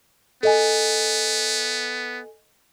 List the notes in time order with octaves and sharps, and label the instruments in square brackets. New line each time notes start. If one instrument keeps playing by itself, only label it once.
[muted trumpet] B3 [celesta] A4 D#5 G#5